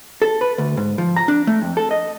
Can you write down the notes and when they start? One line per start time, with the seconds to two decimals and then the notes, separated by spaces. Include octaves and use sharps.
0.22 A4
0.41 B4
0.58 D2
0.77 G#2
0.98 F3
1.16 A#5
1.28 D4
1.47 A3
1.62 F2
1.77 A4
1.91 D#5